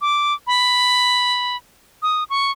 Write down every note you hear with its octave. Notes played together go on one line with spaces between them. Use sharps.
D6
B5
D#6
C#6